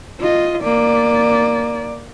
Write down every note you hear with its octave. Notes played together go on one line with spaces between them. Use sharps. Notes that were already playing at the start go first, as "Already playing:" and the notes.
F4 D#5
A#3 D5